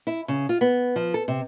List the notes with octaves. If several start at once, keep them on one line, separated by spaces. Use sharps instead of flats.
E4
C#3
F4
B3
F3
A4
C3